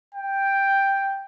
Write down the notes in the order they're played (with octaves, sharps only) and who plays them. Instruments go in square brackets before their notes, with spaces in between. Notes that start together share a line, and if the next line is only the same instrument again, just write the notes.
[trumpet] G5